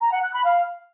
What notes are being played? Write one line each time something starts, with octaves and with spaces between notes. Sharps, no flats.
A#5
F#5
F#6
B5
F5